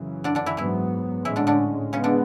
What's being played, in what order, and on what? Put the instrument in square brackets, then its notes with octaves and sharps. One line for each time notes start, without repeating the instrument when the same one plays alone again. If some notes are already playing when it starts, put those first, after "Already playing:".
Already playing: [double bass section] F#2 C#3 E3
[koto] D3 D4
D3 D4
E3 E4
[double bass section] G#2 F#3 B3 [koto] E3 E4
[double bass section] A2 G#3 C#4 [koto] E3 E4
[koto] D3 D4
D3 D4
[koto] C#3 C#4 [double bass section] G#3 B3
[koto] D3 D4